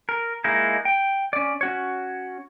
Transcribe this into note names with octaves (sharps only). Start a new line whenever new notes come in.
A#4
G#3 A#3 D#4 E4
G5
C#4 D5
C#4 F#4 C#5